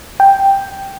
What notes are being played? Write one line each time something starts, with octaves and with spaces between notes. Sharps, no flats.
G5